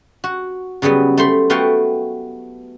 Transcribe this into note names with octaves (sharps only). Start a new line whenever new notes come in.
F#4
C#3 F#3 G3 B3
A3 C5 B5 C6
A3 B3 F#4 F5 G5